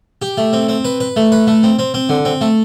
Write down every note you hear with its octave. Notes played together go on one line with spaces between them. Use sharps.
G4
A3
C4
C4
B4
B4
A3
B4
A3
C4
C4
C4
D3
C4
A3